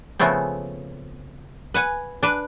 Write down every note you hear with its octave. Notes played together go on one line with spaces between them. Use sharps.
C#3 F3 A3 B3 C4
B4 F#5 G#5
D4 B4